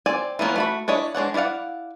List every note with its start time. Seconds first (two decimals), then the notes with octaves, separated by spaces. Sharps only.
0.06 C4 D5 G#5
0.39 E3 F3 A#3 B3 C#4
0.56 A3 F#4 B5
0.88 D4 E4 C#5 D#5
1.15 G#3 D4 C#5 F#5
1.34 E4 C#5 D5 F5 F#5